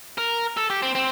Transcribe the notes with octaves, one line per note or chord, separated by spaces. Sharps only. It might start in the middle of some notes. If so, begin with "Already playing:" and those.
A#4
A4
G4
C4
C4